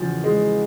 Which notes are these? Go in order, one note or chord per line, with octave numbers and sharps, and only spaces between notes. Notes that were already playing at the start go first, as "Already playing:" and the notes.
Already playing: E2 C#3 F3
G#3